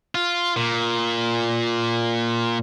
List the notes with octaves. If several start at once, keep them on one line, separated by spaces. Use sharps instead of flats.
F4
A#2